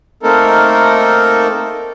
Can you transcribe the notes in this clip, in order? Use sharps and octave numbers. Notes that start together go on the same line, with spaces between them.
A3 A#3 C4 D#4 A4 A#4